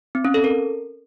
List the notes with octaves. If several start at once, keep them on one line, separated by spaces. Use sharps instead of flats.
C4
C#4
A4
A#4